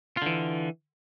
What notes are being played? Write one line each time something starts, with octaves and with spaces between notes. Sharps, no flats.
D3 E3 F4